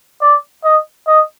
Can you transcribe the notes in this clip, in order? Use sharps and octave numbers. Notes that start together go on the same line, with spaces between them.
D5
D#5
D#5